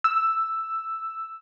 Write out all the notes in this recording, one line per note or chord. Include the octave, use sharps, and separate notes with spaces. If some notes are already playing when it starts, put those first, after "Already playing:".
E6